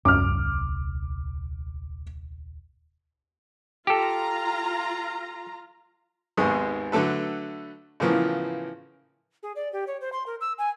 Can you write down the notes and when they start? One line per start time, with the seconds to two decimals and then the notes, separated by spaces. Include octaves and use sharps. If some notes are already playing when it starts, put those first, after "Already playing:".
0.05 D#1 C2 F#2 D6 F6
3.87 F4 G4 A4 A#5
6.37 G#1 D#2 G#2 G#3 B3 D#6
6.92 D3 F#3 A3 A4 B4
8.00 A2 C#3 E3 F3 A#3 B3
9.43 G#4
9.56 D5
9.73 G4
9.87 C#5
10.01 C5
10.12 C6
10.26 A#4
10.41 E6
10.58 G#5